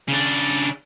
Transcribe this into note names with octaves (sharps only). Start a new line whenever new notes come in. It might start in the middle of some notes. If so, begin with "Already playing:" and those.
C#3 D4